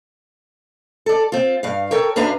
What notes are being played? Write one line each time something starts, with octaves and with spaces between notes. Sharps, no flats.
A4 D5
C4 F4
G2 F5
A4 A#4 C#5 G5
F#2 D4 B4 F5 A#5